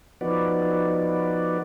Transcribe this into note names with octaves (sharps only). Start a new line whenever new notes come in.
F3 B3 D#4 F#4 B4 D5